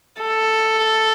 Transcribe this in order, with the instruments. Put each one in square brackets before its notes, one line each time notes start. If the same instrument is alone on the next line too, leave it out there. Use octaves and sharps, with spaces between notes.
[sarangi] A4